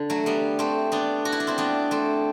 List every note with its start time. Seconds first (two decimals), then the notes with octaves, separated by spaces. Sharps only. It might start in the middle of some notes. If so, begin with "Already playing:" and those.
Already playing: D3
0.10 F#3 A3
0.26 G3 B3
0.59 A3 C4
0.92 B3 D4
1.25 F#4
1.32 E4
1.40 D4
1.47 C4 E4
1.58 B3 D4
1.91 A3 C4